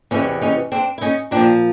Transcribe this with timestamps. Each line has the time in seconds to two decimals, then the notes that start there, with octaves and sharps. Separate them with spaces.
0.11 E2 C3 E3 C#4 D#4
0.41 C#4 D#4
0.72 C4 D4
0.98 E4
1.01 C#4 D#4
1.31 A#2 C4 D4
1.37 F3